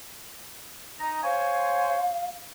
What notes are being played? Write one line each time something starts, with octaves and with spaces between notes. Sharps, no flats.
D#4 A#5
C5 C#5 F5 G#5